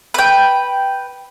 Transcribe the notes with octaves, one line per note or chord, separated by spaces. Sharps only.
B4 G5